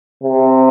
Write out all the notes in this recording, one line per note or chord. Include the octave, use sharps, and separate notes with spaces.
C3